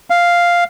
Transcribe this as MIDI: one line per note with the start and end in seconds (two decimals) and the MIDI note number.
0.10 0.64 77